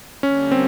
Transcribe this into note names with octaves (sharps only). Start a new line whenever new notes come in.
D3 G3 A#3 C#4
C4